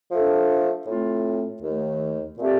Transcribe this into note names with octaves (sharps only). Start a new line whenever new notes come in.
F3 A3 D4 A4
A2 A3 C4 F4
D#2 D#3 A3
A#2 A3 C4 G4 D5